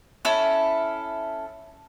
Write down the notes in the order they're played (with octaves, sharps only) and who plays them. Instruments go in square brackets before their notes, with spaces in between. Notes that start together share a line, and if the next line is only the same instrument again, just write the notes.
[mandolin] C#4 E4 A4